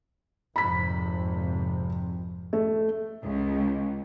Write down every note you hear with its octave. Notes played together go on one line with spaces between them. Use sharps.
G#1 F2 C3 B5 B6
A3
C#2